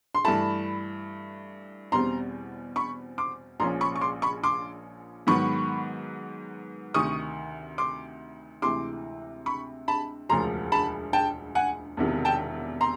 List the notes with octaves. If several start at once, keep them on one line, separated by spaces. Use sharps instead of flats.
C6
G2 E3 A3 A5 B5
E2 B2 G3 C4 A#5 C6
B5 C#6
C6 D6
A#1 A#2 F3 G#3 C#4 A#5 C6
B5 C#6
C#6
C6 D6
B5 C#6
C6 D6
G#2 D#3 F#3 B3 B5 C#6
D2 C3 D#3 C#6 D#6
C6 D6
D2 C3 E3 G#3 C6 D6
B5 C#6
A5 B5
E1 D2 C#3 F3 G#3 A#5 C6
A5 B5
G5 A5
F#5 G#5
E1 E2 C3 D#3
G5 A5
A#5 C6